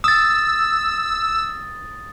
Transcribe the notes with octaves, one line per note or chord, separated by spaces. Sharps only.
D#6 E6 A6